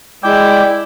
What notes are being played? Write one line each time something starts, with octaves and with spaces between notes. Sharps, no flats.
G#3 E4 D5 G5 D6